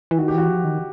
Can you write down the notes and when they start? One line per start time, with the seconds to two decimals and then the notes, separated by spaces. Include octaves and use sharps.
0.11 E3
0.18 D#3 F#4
0.28 G4
0.34 E3 F#4
0.49 F3
0.65 D#3